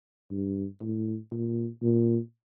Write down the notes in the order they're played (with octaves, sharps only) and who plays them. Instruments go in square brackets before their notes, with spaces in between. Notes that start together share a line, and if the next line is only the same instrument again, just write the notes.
[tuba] G2
A2
A#2
A#2